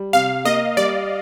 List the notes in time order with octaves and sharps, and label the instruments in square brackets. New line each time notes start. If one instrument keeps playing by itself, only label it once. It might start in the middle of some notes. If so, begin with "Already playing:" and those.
Already playing: [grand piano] G3
[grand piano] C3 [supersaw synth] F5
[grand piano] A#3 [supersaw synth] D#5
[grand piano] G3 [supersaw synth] D5